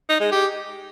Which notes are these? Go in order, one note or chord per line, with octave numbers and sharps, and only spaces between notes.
D#4
G#3
G4